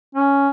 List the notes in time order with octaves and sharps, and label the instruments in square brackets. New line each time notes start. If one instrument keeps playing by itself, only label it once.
[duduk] C#4